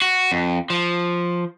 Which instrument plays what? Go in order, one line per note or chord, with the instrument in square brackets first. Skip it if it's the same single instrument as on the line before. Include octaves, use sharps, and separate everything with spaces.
[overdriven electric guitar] F#4
F2
F3